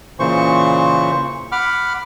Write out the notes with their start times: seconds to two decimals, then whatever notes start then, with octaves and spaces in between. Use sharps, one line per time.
0.19 A#2 C#3 E3 C5 C#6
1.52 F#5 B5 D6 F6